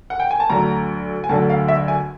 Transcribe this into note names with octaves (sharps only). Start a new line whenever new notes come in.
F#5
G5
G#5
A5
D2 D3 F#3 A#5
G#5
D2 D3 F#3 A5
F5
E5
G#5